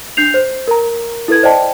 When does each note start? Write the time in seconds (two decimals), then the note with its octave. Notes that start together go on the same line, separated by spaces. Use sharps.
0.17 D4 G6 C7 F7
0.34 C5
0.67 A#4 A#5
1.28 E4 A4 B4 G#6
1.43 C5 D5 D#5 G5 A5